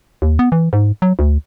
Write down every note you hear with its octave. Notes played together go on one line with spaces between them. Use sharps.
D#2
B3
E3
G#2
F#3
D2